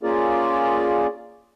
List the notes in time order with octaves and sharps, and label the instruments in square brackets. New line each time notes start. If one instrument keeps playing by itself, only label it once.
[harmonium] A#3 C#4 F4 G#4 A#4 D5